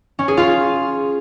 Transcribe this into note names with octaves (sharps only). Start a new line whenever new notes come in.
C#4
G#4
F4